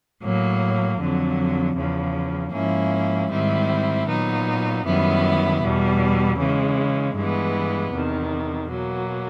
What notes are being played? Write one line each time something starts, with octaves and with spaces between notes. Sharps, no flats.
A2 F#3 A#3
F2 D3 F#3
E2 C#3 F3
G#2 F3 A#3 C#4 E4
G#2 D#3 G3 C4 E4
A#2 F#3 B3 D#4
F#2 D#3 G3 B3 E4
E2 B2 G3
C#3 E3 G#3
G2 E3 G#3 B3
E2 C3 D#3
B2 F#3 A#3